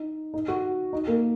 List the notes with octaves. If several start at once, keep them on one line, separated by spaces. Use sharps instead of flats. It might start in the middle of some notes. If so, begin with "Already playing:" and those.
Already playing: D#4
D#4
F#4
D#4
A#3